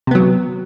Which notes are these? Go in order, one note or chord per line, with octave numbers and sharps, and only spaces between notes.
C3 F#3 B3